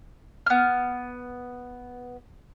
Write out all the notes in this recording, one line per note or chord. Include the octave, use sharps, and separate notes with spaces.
B3 F6